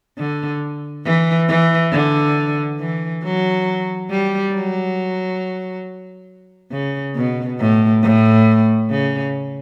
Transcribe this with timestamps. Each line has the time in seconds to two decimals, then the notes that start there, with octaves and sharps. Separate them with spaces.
0.18 D3
1.05 E3
1.48 E3
1.92 D3
2.79 E3
3.23 F#3
4.10 G3
4.54 F#3
6.71 C#3
7.15 B2
7.59 A2
8.02 A2
8.90 C#3